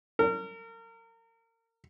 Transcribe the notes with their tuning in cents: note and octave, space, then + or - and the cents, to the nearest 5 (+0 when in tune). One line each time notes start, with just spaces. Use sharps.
A#4 -35